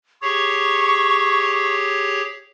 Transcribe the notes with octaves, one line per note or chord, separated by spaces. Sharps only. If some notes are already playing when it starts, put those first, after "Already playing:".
G4 G#4 C#5 C#6